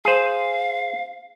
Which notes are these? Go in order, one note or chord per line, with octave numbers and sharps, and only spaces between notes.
G#4 C5 F5